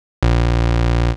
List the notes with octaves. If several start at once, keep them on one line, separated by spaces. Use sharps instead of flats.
A#1